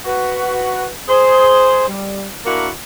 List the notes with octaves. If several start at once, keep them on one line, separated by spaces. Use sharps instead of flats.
F#4 B4
G#4 C5
G3
A#3 D4 E4 F#4 A#4